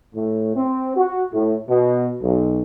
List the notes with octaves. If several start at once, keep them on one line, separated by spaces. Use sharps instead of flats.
A2
C4
F#4
A2
B2
B1